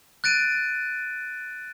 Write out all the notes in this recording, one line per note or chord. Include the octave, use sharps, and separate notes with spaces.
F#6 A6 D7 D#7